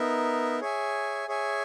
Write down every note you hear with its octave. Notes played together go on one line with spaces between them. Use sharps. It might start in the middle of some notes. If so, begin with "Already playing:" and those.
Already playing: B3 D#4 A#4 E5
G#4 C#5 E5 G#5
G#4 C#5 E5 G#5